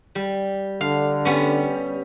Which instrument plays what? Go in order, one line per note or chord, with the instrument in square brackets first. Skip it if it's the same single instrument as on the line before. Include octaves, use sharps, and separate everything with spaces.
[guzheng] G3
[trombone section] D3 [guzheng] F5
[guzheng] G3 B3 C#4